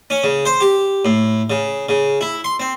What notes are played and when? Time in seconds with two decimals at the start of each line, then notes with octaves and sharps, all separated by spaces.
0.10 C#4
0.24 C#3
0.45 C5
0.61 G4
1.05 A2
1.50 C#3
1.89 C#3
2.21 E4
2.44 C6
2.60 C4